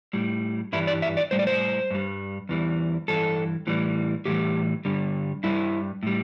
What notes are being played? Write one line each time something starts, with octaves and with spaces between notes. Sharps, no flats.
A2 G3
G2 E3 G3 E4
D5
E5
D5
A2 G3 C5
D5
C5
G2 G3
E2 E3 G3
G2 E3 A4
A2 E3 G3
A2 E3 G3 G4
G2 D3 G3
G2 G3 E4
A2 G3